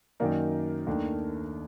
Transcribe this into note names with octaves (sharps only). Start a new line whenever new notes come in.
F#2 D#3 F#3 A#3 D#4 A#4 D5
D#2 D#3 A3 D4